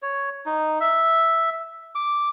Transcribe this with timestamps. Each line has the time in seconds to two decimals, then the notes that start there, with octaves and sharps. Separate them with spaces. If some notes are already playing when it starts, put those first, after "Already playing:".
0.02 C#5
0.46 D#4
0.80 E5
1.95 D6